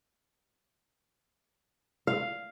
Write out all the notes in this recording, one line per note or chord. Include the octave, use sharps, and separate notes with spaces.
F5